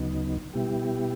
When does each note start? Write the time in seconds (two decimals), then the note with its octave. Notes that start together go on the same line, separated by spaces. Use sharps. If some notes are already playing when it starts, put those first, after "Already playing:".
Already playing: D2 C#3 F#3 B3 D#4
0.53 B2 G3 B3 E4 G4